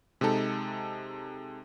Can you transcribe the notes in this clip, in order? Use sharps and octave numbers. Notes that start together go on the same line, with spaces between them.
C3 G#3 D#4 A4